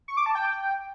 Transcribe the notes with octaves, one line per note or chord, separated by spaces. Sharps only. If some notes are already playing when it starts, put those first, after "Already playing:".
C#6
D6
A5
G5